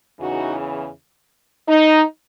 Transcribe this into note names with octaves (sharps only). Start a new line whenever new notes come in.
E2 C#3 E3 D#4 F#4
D#4